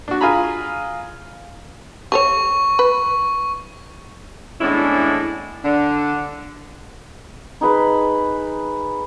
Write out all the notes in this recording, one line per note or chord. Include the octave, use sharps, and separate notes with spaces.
D4 F#4
F4 G#4 G#5 A#5 B5
G4 A4 C#5 C#6
B4
E2 A2 G#3 C#4 D4 E4
D3 D4
D#4 G#4 B4 B5